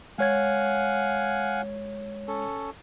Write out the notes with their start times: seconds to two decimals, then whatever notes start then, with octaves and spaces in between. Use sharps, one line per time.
0.19 G#3 C#5 F5 F#5 G#5 G#6
2.28 C#4 A4